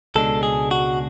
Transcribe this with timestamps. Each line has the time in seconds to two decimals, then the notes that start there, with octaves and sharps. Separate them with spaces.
0.15 C#2 B2 G#3 D4 A4
0.43 G#4
0.71 F#4